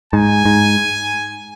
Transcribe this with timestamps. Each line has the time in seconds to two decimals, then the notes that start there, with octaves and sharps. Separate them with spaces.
0.13 G#2 G#5
0.45 G#2